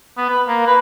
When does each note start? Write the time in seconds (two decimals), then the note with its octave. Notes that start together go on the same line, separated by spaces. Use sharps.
0.17 B3
0.30 B4
0.48 A#3
0.68 B4